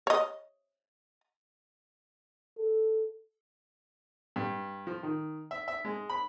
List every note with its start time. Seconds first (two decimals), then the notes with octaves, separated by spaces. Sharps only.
0.07 C#5 D#5
2.58 A4
4.36 G2
4.87 F3
5.03 D#3
5.51 E5
5.68 E5
5.85 G#3
6.10 B5